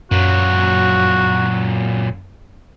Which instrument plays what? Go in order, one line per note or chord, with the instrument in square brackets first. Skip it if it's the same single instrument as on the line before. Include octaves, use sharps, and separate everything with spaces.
[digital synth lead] F#2 [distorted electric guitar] A#2 F#3 [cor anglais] F#4